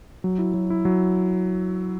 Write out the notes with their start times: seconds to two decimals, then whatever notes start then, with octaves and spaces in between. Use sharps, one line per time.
0.24 F#3
0.39 E4
0.54 F#3
0.70 E4
0.85 F#3